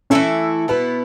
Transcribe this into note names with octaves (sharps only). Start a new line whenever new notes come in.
E3 A3 C#4 E4 A4
B2 B3 E4 B4